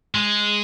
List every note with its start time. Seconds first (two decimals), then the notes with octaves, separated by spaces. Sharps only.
0.15 G#3